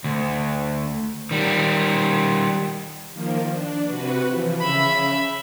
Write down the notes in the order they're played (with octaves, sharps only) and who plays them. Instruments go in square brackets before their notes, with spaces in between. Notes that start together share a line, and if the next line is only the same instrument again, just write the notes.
[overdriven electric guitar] D2
D#3 G3
[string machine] D#3 F3 A#3
D4
C3 F#4 B4
E3 F3
[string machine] C#3 [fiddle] E5 B5